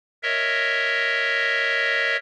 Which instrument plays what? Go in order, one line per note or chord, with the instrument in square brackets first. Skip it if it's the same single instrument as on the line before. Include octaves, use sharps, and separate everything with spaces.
[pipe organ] A#4 C#5 D#5 E5